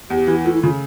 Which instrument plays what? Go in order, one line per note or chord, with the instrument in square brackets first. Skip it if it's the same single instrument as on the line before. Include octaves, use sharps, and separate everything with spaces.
[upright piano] E2 [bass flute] G4
[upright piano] E3
[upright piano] A3 [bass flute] F4
[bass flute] E4
[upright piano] C#3 [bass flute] F4